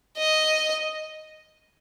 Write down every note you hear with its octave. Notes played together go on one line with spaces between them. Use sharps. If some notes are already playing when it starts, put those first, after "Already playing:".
D#5